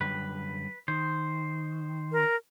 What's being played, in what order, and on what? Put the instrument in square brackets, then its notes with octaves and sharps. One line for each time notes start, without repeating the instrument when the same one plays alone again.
[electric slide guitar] F#2 D3 G3 [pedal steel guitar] B4
[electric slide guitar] D#3 [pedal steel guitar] C5
[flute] A#4